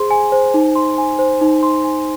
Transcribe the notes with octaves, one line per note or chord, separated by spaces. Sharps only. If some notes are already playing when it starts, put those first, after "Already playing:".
Already playing: G#4 C5 C6
G#5
C5
D#4
C6
G#5
C5
D#4
C6
G#5